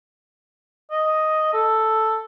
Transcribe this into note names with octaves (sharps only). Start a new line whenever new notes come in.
D#5
A4